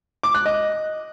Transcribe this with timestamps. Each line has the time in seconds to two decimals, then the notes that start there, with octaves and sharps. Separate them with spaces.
0.23 D6
0.35 F#6
0.46 D#5